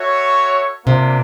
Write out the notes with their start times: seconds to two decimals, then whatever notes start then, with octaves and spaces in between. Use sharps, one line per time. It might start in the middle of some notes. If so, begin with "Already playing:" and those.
Already playing: F#4 A4 C#5 E5
0.86 C3 A#3 D4 F4